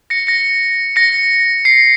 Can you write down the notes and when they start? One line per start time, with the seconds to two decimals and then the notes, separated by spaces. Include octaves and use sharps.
0.10 A#6 C#7
0.27 A#6 C#7
0.96 A#6 C#7
1.65 C7